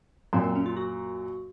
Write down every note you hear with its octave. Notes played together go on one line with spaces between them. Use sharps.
F#2 A#2 C4
C4
C#4
F4
F#4